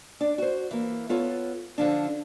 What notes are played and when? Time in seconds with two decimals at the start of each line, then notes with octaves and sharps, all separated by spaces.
0.20 D4 D5
0.38 F#4 C5
0.71 E3 A#3
1.09 B3 F4 A4 C#5
1.78 D3 F3 D4